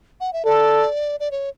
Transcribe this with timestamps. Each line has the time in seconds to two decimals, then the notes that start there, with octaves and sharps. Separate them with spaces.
0.20 F#5
0.33 E5
0.45 A4 D5
1.20 D5
1.31 C#5